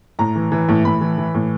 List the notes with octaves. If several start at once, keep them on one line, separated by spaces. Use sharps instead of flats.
A2 A#5
E3
E3
A2
A2 B5
E3
E3
A2